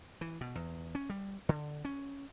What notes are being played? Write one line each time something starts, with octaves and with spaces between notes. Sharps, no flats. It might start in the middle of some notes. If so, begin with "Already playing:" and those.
E3
B2
E2
C#4
G3
D3
C#4